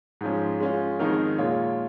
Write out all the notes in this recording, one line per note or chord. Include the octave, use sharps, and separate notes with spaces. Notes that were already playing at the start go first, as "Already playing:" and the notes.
G#2 F3 C#4
G#3 C#4 F4
F2 D#3 G#3 D#4 A#4
A#2 G#3 F4 C#5